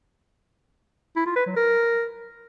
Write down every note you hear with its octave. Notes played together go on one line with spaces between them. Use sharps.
E4
F4
B4
F#3
A#4